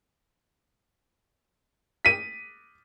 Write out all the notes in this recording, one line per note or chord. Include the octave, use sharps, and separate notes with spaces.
B6 D#7